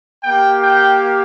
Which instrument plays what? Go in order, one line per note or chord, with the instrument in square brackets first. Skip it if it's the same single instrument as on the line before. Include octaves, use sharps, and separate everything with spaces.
[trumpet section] A#3 G4 G5
G5